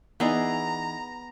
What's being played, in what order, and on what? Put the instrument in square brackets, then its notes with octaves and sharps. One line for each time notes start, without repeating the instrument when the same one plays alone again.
[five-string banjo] E3 D#4 [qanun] B3 G#4 D5 [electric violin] A#5